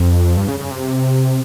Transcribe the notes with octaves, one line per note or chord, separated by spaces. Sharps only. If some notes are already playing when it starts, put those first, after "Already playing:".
Already playing: F2
G2
C#3
C#3
C3